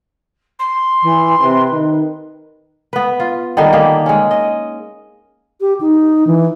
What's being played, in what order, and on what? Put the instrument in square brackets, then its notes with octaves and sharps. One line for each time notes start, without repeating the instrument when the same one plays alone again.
[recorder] C6
[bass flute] E3
[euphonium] C3 [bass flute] B4
[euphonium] D#3
[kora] B3 B4
F4
D3 D#3 G3 D#4
A#3 G4 G#4
G#3 C#4
D#5
[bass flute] G4
D#4
E3